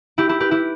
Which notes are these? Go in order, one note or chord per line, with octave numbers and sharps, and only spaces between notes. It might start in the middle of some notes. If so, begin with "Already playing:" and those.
E4 G4
E4 G4
G4 B4
E4 G4